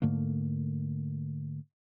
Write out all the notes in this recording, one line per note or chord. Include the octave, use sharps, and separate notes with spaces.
G#2 D3 A3 A#3